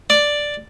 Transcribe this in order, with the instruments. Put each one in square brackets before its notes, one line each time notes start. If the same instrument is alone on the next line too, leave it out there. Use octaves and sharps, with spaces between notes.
[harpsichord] D5